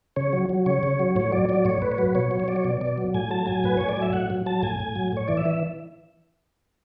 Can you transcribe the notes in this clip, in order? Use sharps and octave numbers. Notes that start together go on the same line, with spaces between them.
C#3 C#5
F#3
F#3
C#3 C#5
C#3
F#3
A2 C#5
F#3 D5
F#3 D5
A2 C#5
A2 B4
C#5
F#3 B4
B2 C#5
F#3
C#5
F#3 D5
C#5
B2 D5
B2 D5
F#3
A2 G#5
F#3 A5
F#3 G#5
A2 B4
A2 C#5
D5
F#3 E5
A2 F#5
F#3
F#3 A5
A2 G#5
A2
F#3
A2 C#5
E3 D5
E5
E3